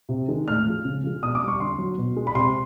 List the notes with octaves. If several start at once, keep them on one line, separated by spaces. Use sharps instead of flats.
C3
D#3 G#3
A2 F6
F3 G#3
C#3
F3 G#3
B2 D#6
D6
G3
C#6
D3 C6
F#3
B2
G#3
B5
C3 C6